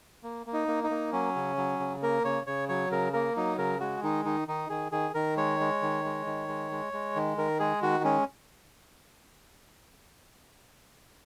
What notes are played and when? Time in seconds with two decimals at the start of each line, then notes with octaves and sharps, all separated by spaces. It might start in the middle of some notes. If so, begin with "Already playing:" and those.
0.23 A#3
0.46 A#3
0.53 D#4
0.68 A#3
0.84 D#4
0.91 A#3
1.13 F#3 C#4
1.36 C#3
1.57 F#3
1.80 C#3
2.02 A#3 A#4
2.25 C#3 C#5
2.47 C#3 C#5
2.69 F#3 C#5
2.91 C#3 A#4
3.13 A#3 A#4
3.37 F#3 D#4
3.58 C#3 A#4
3.80 G#3 F#4
4.03 D#3 D#4
4.25 D#3 D#4
4.48 D#3 D#4
4.70 D#3 G#4
4.92 D#3 G#4
5.14 D#3 A#4
5.37 G#3 C#5
5.60 G#3
5.82 D#3
6.05 G#3
6.26 D#3
6.48 G#3
6.72 G#3
6.93 G#3
7.16 D#3
7.37 D#3 A#4
7.60 G#3 G#4
7.82 D#3 F#4
8.04 G#3 C#4